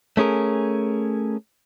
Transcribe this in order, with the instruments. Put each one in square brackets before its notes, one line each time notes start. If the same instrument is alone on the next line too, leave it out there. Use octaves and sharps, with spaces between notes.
[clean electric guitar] A3 C#4 G#4 A#4